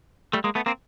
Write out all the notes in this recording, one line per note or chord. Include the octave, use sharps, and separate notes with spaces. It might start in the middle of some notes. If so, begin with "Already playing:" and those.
G3 A3
G#3 A#3
A3 B3
A#3 C4